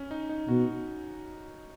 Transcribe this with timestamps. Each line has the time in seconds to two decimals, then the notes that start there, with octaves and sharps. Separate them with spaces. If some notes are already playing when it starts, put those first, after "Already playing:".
Already playing: C#4
0.11 D#4
0.29 D#4
0.48 B2 F#4